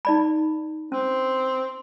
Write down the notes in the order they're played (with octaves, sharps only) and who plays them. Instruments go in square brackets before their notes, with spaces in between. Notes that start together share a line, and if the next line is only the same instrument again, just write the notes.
[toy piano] D#4 D5 B5
[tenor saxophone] C4 [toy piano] C#4